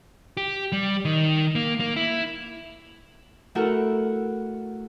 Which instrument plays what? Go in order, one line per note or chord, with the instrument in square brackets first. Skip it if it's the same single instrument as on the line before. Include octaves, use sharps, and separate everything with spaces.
[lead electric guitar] G4
G3
D#3
A#3
A#3
E4
[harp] A3 E4 F#4 A4 A#4 F#5